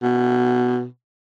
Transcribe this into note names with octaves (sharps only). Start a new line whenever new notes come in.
B2